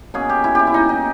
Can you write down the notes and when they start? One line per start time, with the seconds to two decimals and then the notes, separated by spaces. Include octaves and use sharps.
0.14 B2 A#3 C#4 G#4
0.29 G4
0.44 E4
0.55 E4 G4
0.67 E4
0.74 D#4
0.89 D#4